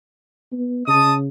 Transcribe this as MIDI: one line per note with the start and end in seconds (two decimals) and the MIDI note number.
0.52 0.86 59
0.87 1.28 49
0.87 1.15 75
0.87 1.15 81
0.87 1.15 87